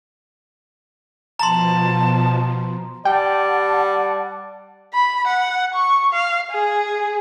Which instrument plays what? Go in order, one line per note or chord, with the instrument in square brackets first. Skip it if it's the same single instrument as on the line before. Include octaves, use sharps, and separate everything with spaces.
[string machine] B2 F3 [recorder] A5 [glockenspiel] A#5 C6
[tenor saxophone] G3 [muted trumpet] D5 [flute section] F#5 A5 [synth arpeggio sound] G5
[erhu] B5
F#5
C#6
F5
G#4